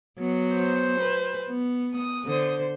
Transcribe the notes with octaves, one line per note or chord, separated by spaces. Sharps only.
F#3 B3
C5
B4
B3
D#6
D3 C5